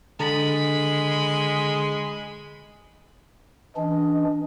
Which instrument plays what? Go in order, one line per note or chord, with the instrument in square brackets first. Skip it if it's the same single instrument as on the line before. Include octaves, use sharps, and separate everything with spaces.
[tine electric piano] D3 A6 [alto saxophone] G#3 [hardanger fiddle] B5
[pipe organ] E3 C#4 D4 [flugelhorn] D#5